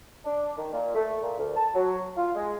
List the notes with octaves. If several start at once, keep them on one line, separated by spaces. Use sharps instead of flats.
D4
D#3
A#2
A3
A#2
D2
A5
F#3
F4
G#3